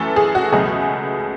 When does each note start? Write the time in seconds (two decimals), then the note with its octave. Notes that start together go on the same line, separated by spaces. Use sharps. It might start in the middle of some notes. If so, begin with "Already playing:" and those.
Already playing: F#2 E3 A3 A4
0.16 G#4
0.35 F#4
0.52 C#2 B2 F#3 A3 G#4